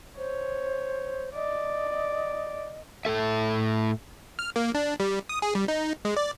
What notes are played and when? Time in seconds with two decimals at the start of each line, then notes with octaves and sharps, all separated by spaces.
0.18 C5 C#5
1.35 D5 D#5
3.05 A2 A3 A4 E5
4.39 F6
4.56 A#3
4.75 D4
5.00 G3
5.29 D#6
5.42 G#4
5.55 G3
5.68 D#4
6.05 G#3
6.17 D5